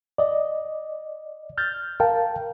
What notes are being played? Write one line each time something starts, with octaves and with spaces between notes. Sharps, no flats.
D5 D#5
F6 G6 A6
A#4 F5 G5 A5